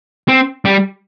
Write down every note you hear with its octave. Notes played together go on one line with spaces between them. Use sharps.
C4
G3